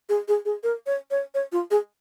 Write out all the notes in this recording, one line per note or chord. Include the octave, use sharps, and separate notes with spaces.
G#4
G#4
G#4
A#4
C#5
C#5
C#5
F4
G#4